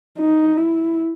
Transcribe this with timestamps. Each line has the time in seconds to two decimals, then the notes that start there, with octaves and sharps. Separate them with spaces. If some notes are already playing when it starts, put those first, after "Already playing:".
0.19 D#4
0.57 E4